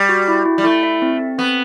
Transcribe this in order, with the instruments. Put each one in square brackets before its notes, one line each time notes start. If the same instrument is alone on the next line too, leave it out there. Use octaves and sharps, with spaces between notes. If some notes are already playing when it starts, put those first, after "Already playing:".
Already playing: [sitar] G3
[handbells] F#4
E4
E4
[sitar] G3
[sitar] A3 [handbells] E4
[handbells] E5
C4
C4
[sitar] B3 [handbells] C4